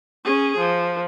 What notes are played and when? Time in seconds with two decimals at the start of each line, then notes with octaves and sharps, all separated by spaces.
0.25 C#4 G#4
0.58 F3